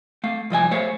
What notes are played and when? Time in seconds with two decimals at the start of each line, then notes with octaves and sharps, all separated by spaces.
0.24 A3 F5
0.50 C2 F3 D#5 G#5
0.71 A3 C5 C#5 E5 F5